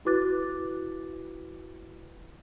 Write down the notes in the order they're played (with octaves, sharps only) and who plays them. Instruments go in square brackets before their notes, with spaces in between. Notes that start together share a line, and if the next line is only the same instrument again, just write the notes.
[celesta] E4 F#4 B4 D6 F#6 A6